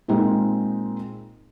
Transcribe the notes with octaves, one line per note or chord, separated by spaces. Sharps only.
A#2 G#3 C4 D#4